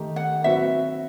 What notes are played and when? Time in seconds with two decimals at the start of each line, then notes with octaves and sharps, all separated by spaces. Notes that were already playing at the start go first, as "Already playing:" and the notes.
Already playing: D#3 A3 D#4 G4
0.16 F#5
0.44 F#3 C4 F#4 B4 E5